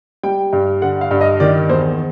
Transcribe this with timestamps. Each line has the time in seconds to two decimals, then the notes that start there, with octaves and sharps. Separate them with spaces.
0.23 G3 G5
0.53 G2
0.82 D3 F#5
1.01 F5
1.11 G2
1.21 D#5
1.40 D#3 D5
1.69 E2 C5